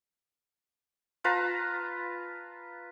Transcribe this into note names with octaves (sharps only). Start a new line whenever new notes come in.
F4 B4 A5 A#5